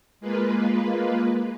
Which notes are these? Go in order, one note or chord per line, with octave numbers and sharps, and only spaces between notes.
G#3 A#3 F4 B4